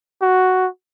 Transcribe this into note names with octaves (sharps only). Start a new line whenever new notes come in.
F#4